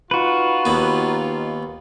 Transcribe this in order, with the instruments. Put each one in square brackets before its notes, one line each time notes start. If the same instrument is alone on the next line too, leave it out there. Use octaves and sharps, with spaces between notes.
[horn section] D#4 F4 [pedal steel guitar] F#4 B4
[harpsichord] D#2 B3